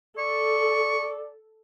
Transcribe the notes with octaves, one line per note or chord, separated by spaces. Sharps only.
A4 D5 C#6